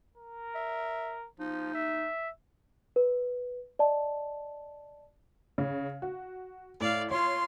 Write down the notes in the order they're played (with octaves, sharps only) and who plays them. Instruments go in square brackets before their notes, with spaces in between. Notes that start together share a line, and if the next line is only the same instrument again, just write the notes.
[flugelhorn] A#4
[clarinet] E5
[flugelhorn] F3 [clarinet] D#4
[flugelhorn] E5
[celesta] B4
D5 D#5 A5
[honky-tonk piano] C#3
F#4
[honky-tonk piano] A2 [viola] D5 F5
[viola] F4 C6 [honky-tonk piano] C#5